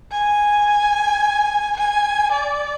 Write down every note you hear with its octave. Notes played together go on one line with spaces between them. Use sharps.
G#5
G#5
D5